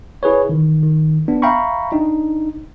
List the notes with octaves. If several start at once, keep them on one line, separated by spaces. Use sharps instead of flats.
E4 G#4 B4 C#5
D#3 E3
D#3
B3 D4
E5 F5 G5 A#5 B5 C#6
D4 D#4